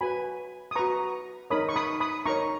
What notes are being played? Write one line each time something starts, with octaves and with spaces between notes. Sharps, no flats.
F#4 B4 G#5 B5
D#6
F#4 B4 A#5 C#6
D#4 A#4 C#5 B5 D#6
C#6
B5 D#6
B5 D#6
D#4 A#4 C#5 A#5 C#6